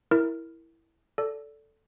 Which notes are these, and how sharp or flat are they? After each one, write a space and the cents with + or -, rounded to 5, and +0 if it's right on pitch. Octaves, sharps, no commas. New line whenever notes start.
E4 +0 A#4 +0
A4 +0 D5 -25